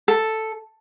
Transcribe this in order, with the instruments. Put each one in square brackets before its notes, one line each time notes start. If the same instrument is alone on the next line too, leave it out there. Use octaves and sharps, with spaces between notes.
[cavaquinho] A4